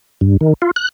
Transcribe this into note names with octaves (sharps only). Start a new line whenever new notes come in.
G2
D#3
F4
F#6